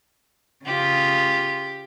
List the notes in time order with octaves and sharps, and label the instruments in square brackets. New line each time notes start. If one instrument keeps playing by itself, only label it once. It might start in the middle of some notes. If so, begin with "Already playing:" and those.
[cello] C#3 F4 [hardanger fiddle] G4